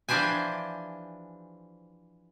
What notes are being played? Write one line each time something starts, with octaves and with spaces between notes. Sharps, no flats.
E3 F3 D4 G4 C5 G#5